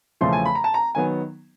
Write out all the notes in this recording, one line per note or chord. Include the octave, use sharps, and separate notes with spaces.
E2 C#3 F3 A3 C6
G#5
B5
A#5
A5
A#5
D#3 F#3 B3 G#5